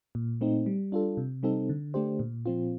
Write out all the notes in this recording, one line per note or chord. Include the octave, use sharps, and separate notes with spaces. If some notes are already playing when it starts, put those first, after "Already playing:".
A#2
A3 C4 D#4
G3
D4 F4 A4
C3
G3 C4 D#4 A4
D3
A3 D4 G4 C5
A#2
F3 C4 F4